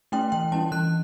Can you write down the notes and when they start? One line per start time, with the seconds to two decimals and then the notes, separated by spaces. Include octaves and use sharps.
0.12 A3 C#4 E4 G5
0.32 E3 G5
0.52 G3 C#4 E4 A5
0.72 E3 F#6